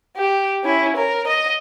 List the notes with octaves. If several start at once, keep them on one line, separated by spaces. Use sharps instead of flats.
G4
C#4 E4
A#4
D#5